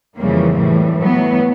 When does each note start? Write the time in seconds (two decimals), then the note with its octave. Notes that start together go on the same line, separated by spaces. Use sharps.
0.16 F2 C#3 E3 G3 A#3
0.57 A2 E3 G3
0.97 A2 F#3 B3